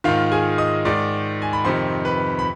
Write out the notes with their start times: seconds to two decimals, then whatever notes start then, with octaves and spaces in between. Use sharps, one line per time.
0.04 G#2 D#3 F4 F5
0.32 G#4 G#5
0.58 D#5 D#6
0.85 G#2 D#3 D5 D6
1.42 G#5
1.53 B5
1.65 F2 C3 D#3 C5 C6
2.05 B4 B5
2.39 B5